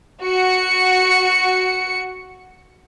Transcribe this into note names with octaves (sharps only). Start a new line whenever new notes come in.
F#4 C#7